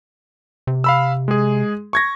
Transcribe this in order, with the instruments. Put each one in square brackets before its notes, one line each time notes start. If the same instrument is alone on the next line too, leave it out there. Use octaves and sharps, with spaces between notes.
[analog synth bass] C3
[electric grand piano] F5 B5 E6
G#3 G#4
C#6 G#6 A#6